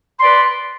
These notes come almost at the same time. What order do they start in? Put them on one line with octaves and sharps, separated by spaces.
C6 D5 B4